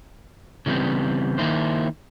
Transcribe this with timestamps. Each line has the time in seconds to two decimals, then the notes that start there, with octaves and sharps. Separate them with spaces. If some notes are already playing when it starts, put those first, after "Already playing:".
0.66 C#3 E3 G3 B3 C4
1.38 D#3 A#3 D#4 E4 C5